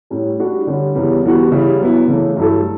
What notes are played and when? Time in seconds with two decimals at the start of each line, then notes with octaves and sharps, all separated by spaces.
0.10 A2 G3 C#4
0.39 G3 D4 F#4
0.67 D3 G3 C#4
0.95 E2 C#3 E3 G3 B3
1.24 E3 G3 B3 F#4
1.51 C#3 G3 C#4 E4
1.80 F#3 B3 E4
2.08 C#3 E3 A3
2.37 G2 F#3 A3 E4 A4